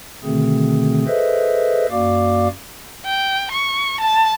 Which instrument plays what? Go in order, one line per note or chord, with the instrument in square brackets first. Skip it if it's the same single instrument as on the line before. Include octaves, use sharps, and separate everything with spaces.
[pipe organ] B2 D3 D#3 A3 C4 G#4
G#4 A4 B4 C5 D#5 E5
F#2 A#3 F#4 D5 F5 D6
[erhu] G5
C#6
A5